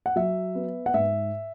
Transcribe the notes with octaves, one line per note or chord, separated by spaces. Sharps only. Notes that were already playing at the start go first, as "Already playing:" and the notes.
F#5
F#3 E5
B3
F#5
G#2 E5